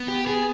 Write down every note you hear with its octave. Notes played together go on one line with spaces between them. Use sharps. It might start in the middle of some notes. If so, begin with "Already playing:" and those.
Already playing: B3
G4
G#4